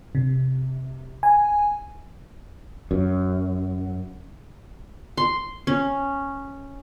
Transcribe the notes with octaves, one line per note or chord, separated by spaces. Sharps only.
C3
G#5
F#2
C6
C#4